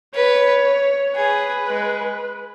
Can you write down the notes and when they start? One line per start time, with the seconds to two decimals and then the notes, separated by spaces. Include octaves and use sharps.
0.15 B4 C#5
1.16 G#4 B4
1.68 G#3